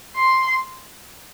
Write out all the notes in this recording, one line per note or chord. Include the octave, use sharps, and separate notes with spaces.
C6